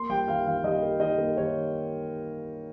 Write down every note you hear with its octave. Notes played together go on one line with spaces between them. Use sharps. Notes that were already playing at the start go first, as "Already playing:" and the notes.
Already playing: A#3 C6
G3 G5
D#3 F5
D#3 F5
G3 D#5
A#3
D#3 D#5
A#3
D#3 C#5